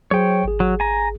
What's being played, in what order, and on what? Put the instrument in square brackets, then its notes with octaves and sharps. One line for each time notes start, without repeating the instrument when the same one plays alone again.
[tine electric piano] F#3 G#4 C5 [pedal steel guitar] C#5 G5
[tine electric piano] G#1 G#4
[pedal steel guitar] F#3
G#5 A#5